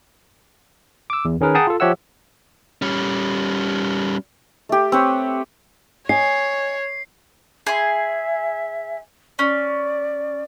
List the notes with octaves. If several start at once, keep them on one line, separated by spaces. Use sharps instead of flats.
D6 E6
E2
D#3 C#4 G#4 A#4 B4
G#4 F#5 G5 A5 A#5 D#6
F4 A4
F3 G4 C#5 E5 F#5 E6
G3 C#4
A3 G4
C4 B4 C#5
C#5 D#5 G#5 C7
G#4 E5 C6
C#4 D5